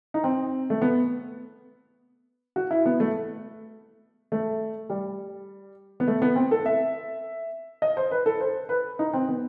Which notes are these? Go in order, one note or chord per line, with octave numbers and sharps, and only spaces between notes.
D#4
C4
A3
B3
F#4
E4
B3
A3
A3
G3
B3
A3
B3
C4
A4
E5
D#5
C5
B4
A4
C5
B4
D#4
C4
B3